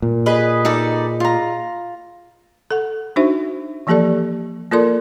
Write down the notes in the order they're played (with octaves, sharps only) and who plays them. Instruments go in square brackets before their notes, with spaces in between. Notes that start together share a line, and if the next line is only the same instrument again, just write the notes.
[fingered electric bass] A#2
[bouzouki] G#4 B4 D#5
[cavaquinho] D#4 A4 D5
F4 A#5
[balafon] A4 F#5
D4 D#4 F#4 C5 E5
E3 F3 A#3 G4 A4 D5
A#3 F4 A4 A#4 D5 C6